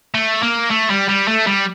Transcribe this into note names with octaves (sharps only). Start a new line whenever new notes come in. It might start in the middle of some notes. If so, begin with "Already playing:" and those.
A3
A#3
A3
G3
G3
A3
G3